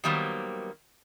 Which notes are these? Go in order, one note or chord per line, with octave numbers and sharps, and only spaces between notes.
D#3 F#3 G3 A#3 B3 C5